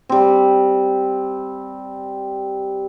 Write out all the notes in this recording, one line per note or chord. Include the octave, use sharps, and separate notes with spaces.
G3 C4